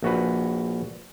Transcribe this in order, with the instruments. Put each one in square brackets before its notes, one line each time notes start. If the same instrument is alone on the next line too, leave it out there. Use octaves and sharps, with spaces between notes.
[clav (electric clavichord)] A#1 F#4 B4